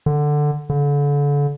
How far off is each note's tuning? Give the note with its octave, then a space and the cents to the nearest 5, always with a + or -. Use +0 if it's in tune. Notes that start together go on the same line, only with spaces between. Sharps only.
D3 +10
D3 -35